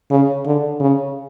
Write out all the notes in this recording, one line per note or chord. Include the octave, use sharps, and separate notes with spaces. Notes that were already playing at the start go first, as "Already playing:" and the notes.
C#3
D3
C#3